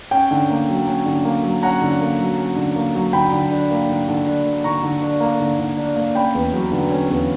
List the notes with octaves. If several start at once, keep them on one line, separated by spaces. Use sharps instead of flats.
C#4 G5
D3
A#3
F#3
C#4
D3
A#3
F#3
C#4 F#5 A#5
D3
A#3
F#3
C#4
D3
A#3
F#3
D3 G5 B5
D3
D4
A#3
D3
D3
D4
A#3
D3 A#5 C#6
D3
D4
A#3
D3
D3
D4
A#3
C#4 G5 B5
E2
F#3
D3
C#4
E2